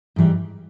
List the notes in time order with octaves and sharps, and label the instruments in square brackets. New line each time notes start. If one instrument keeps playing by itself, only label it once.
[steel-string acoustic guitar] G#2 E3 G3